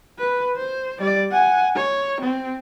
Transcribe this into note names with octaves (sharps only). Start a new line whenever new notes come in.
B4
C5
G3 D5
F#5 G#5
C#5
C4